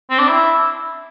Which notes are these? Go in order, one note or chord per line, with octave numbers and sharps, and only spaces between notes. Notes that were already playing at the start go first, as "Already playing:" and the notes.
C4
D4
E4